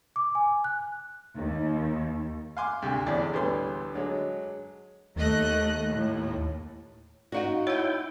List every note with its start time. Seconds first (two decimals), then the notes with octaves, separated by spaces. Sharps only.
0.16 D6
0.35 G#5
0.64 F#6
1.36 D#2
2.57 F5 F#5 G#5 C6 D6
2.82 D2 C3
3.06 A1 E2 A2 G#4 D5
3.33 D2 A2 G3 B3 C6
3.94 D3 F#3 G#3
5.16 D#2 A3 D#5 F#6
5.92 A2
7.32 D#4 F#4 D5 F5 F#5
7.67 E4 C#5 F#5 G5